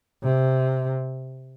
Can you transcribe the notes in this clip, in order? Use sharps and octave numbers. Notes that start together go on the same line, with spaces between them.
C3